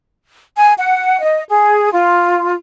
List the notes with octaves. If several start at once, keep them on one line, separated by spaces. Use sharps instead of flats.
G#5
F#5
D#5
G#4
F4